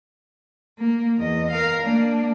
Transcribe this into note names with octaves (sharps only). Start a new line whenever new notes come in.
A#3
E2 D#5
A#4 F5
A#3 D4